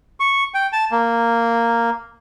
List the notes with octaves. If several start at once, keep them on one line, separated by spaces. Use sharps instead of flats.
C#6
G5
A5
A#3